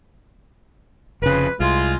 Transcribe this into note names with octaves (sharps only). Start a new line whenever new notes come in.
F1 F2 C#3 B4
C2 G#3 F4